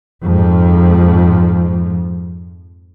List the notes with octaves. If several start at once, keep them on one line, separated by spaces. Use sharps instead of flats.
F2 G#2 F3